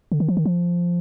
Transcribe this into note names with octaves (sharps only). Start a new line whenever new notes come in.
D3
D#3
F3
D#3
F3